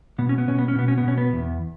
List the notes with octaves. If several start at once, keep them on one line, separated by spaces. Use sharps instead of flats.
B2 B3
C#4
B3
B2 C#4
B3
C#4
B2 B3
C#4
B3
B2 C#4
B3
E2